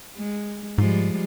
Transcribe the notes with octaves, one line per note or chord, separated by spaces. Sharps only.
G#3
G#2 F3 G3 G#3